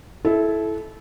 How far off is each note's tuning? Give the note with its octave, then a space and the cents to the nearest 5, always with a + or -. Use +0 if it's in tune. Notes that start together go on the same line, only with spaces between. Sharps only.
E4 +0 A4 -25